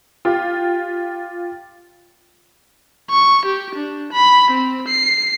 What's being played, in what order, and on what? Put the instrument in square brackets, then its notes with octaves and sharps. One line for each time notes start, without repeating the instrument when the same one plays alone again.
[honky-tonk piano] F4 G4
[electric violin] C#6
G4
D4
B5
C4
C7